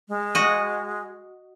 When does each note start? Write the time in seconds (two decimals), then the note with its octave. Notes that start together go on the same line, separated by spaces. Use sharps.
0.08 G#3
0.35 F#4 D#5